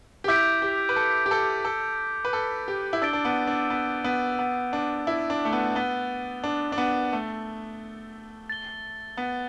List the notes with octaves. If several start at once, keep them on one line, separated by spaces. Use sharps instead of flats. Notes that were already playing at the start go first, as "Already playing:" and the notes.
G4
E4 D6 G6 B6 D7
G4
B4
A4
G4
A4
A4
B4
A4
G4
E4
D4 E6 A6 D7 G7
D4
B3
D4
B3
B3
B3
D4
E4
D4
A3
B3
B3 A6 G7
D4
D4
B3
A3
A6 G7
B3